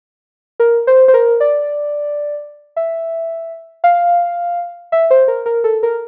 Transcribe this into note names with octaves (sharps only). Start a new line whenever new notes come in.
A#4
C5
C5
A#4
D5
E5
F5
E5
C5
A#4
A#4
A4
A#4